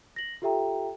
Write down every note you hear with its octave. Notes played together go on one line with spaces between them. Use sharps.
A#6 F#7
F4 G4 A4 E5 G5 A#5